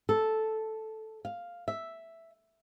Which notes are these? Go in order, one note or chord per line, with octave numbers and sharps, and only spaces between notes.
A4
F5
E5